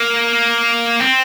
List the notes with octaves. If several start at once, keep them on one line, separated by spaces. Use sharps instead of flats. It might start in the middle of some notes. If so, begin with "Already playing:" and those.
Already playing: A#3
C4